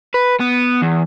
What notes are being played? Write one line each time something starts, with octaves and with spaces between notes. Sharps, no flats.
B4
B3
E2